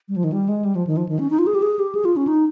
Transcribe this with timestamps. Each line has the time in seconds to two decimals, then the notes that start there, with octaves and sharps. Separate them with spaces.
0.09 G3
0.16 F3
0.24 D#3
0.32 G3
0.49 G#3
0.65 G3
0.75 F3
0.87 D#3
0.97 F3
1.09 D#3
1.19 C#4
1.30 D#4
1.39 F4
1.47 G#4
1.55 G4
1.62 G#4
1.79 G4
1.95 G#4
2.05 F4
2.16 C#4
2.27 D#4